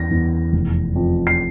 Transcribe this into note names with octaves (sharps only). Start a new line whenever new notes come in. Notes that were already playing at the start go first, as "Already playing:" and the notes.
Already playing: E2 A#6
E2
F1
F2
C7